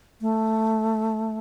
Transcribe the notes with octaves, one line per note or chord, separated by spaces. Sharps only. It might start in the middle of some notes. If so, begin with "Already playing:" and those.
A3